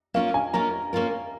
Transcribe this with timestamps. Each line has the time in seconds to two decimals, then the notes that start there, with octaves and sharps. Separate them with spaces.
0.14 A#3 C#4 F4 A#4 F5
0.34 G#5
0.53 A#3 C#4 F4 A#4 A#5
0.93 A#3 C#4 F4 A#4